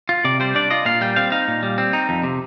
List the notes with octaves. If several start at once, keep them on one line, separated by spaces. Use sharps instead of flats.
F4
C3 D5
G3 C5
D4 D5
F4 D#5
A#2 F5
G3 G5
C4 F5
D#4 F5
A#2
G3
C4
D#4
F2
C3